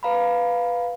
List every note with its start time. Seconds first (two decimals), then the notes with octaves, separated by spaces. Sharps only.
0.03 B4 F5 A#5 B5